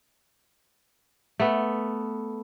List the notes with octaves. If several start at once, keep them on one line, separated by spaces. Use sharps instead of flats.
A3 B3